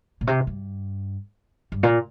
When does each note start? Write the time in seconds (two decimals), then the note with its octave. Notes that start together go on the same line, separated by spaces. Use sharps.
0.21 A#2
0.27 C3
0.47 G2
1.72 G2
1.83 A#2